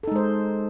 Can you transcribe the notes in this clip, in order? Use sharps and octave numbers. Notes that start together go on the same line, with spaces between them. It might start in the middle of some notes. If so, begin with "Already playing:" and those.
G#3 D#4 A4 C5